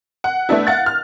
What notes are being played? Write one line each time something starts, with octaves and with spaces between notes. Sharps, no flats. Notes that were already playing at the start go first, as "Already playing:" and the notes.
F#5
A3 B3 D4 E4
F5 F#5 F#6 A6
F6